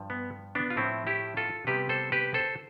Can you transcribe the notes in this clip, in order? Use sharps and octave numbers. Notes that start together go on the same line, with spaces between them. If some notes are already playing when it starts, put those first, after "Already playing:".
Already playing: G2 F3
B3
B3 D4
F4
A2 F3 A3 C4 E4
E4 G4
F4 A4
C3 G3 B3 G4 B4
A4 C5
G4 B4
A4 C5